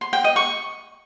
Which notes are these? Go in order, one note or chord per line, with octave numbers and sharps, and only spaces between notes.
C6
G5
D#5
C#6